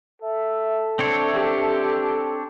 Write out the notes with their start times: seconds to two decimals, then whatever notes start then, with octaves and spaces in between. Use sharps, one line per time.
0.22 A4 E5
0.99 C4 D4 C#5
1.33 G4